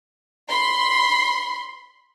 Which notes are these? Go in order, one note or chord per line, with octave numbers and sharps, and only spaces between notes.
B5 C6